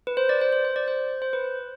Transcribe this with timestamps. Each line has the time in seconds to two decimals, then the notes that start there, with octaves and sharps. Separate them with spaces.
0.07 B4
0.17 C5
0.29 D5
0.41 C5
0.52 C5
0.65 C5
0.76 D5
0.88 C5
1.22 C5
1.33 B4